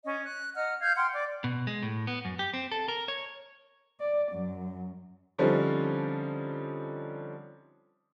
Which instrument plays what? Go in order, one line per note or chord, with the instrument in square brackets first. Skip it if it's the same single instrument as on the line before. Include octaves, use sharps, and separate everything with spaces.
[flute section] C#4 D#5
F#6
D#5 F#5 A#5 F6
F5 F6 G6 G#6
F#5 G5 C6 F6
D5 D6
[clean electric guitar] B2
G#3
A2
B3
F#2
G4
C4
A4
A#4
C#5
[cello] D5
F#2
[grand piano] D3 F3 G3 C4 C#4 D#4